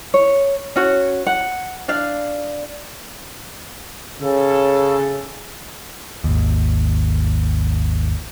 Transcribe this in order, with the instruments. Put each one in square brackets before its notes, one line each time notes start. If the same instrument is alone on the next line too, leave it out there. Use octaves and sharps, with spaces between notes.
[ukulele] C#5
C#4 F#4 C#5
F#5
D4 D5 F5
[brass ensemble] C#3 G#4 A4
[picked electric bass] G#1 D#2